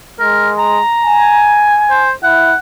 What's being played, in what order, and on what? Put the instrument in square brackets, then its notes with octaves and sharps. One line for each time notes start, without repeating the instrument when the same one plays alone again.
[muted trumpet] G#3 [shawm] A#4
[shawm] A#5
[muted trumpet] G#5
[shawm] C5
[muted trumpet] E4 [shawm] F#5